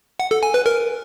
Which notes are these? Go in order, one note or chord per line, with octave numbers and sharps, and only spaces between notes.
F#5
A4
G#5
B4
A#4